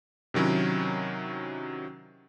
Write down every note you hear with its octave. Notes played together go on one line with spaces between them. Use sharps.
C3 D#3 F#3 C#4 E4